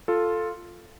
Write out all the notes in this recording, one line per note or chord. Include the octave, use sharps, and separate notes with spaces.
F4 A4